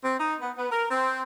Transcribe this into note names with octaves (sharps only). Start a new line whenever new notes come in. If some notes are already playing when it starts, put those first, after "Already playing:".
C4
D#4
B3
B3
A#4
C4